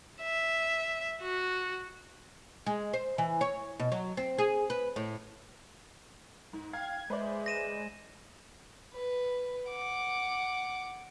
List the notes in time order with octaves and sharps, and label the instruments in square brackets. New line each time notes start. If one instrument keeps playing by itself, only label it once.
[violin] E5
F#4
[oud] G#3
C5
E3
C#5
B2
F#3
C4
G#4
B4
A2
[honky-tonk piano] G#2
[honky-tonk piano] F5 [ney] G5 [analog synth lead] G#6
[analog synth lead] G#3 [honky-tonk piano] B4 C5 D5 [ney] E5
[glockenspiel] A#6 D#7 E7
[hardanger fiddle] B4
F#5 D6